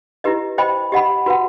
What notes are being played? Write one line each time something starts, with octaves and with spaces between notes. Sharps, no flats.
E4 G4 B4 D#5
C5 D#5 G5 B5
G4 D#5 F#5 B5
F#4 B4 F#5